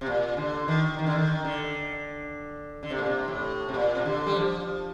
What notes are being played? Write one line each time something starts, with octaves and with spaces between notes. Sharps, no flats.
C3
A#2
D3
D#3
D#3
D3
D#3
D3
D3
C3
A#2
C3
A2
C3
A#2
C3
D3
G3
F3